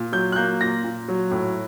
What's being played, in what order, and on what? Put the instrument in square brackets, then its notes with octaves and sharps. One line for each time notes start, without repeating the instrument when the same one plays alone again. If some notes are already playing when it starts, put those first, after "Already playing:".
Already playing: [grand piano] A#2
F#3 G6
F#6
A#3 G6
A#2 A#6
A#2
F#3
A2